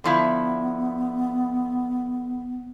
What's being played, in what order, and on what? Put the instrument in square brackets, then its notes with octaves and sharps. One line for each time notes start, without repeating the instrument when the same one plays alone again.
[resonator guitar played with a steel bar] D3 F3 E4 [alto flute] B3